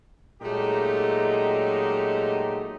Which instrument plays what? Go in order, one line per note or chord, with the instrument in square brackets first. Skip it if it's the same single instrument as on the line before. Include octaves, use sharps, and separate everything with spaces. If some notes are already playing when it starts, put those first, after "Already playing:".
[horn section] A#2 F#3 G#3 A3 D#4 G4